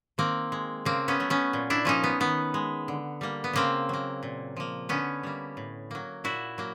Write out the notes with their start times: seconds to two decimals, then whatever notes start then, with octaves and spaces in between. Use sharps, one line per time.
0.18 D#3 A#3 C4
0.52 G#3
0.85 C#3 A#3 C4
1.08 B3 C#4
1.20 F#3 A3
1.30 B3 C#4
1.53 A#2
1.70 D4 E4
1.85 F3 A#3 C#4 D#4
2.04 B3
2.20 D#3 B3
2.54 G#3
2.88 D3
3.21 G3 A#3
3.44 B3
3.53 C#3 A#3 C4
3.89 F#3 A#3
4.23 A#2
4.57 F3 A#3
4.89 D3 B3 C#4
5.23 G3 A#3
5.57 A2
5.91 F#3 A#3
6.24 A#2 E4 F#4
6.58 F#3 A#3